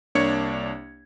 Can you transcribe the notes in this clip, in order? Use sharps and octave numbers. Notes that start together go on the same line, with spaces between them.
C2 A#3 D4 C#5 G#6 C#7